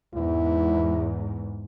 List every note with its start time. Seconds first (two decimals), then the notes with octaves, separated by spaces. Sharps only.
0.15 E2 G#2 E4